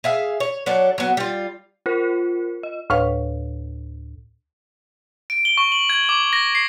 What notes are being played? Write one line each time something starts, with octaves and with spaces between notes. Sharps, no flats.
G#4 E5 F5
C#5
F#3 C#4 D4 A4
F#3 B3
G3 F4
F4 A#4 C5
D#5
D2 A2 B4 C#5 F5
D7
G7
C#6
F#7
G#6
D6
A#6
C7